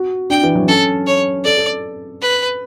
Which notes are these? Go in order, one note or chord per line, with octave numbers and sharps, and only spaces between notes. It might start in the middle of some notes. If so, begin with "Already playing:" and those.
Already playing: F#4
D4 G5
E3
F#3
C#4 A4
C#5
A4 D5
A4
B4